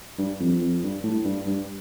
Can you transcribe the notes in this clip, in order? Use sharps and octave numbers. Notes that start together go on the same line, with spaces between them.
G2
F2
F2
G2
A2
G2
G2